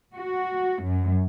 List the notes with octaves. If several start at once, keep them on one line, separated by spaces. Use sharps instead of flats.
F#4
F#2